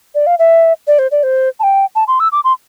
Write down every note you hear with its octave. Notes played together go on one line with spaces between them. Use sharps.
D5
F5
E5
D5
C5
D5
C5
A5
G5
A5
C6
E6
D6
C6